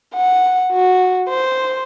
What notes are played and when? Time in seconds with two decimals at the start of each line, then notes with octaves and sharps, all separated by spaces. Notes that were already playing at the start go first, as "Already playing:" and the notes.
0.15 F#5
0.73 F#4
1.29 C5